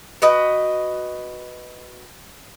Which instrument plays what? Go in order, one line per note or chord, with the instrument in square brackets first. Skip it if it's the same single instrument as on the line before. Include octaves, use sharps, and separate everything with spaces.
[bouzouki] F#4 B4 D#5 G5